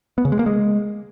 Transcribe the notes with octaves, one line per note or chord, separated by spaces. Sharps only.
B3
C#3
G#3
A#3
G#3